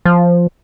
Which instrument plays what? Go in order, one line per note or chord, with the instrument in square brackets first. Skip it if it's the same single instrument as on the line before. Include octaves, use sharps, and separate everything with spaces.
[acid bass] F3